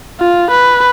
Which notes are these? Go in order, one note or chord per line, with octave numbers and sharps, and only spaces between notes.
F4
B4